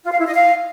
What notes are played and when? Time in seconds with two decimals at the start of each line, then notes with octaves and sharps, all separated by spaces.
0.04 F4
0.12 F5
0.19 E4
0.27 D#5
0.34 F5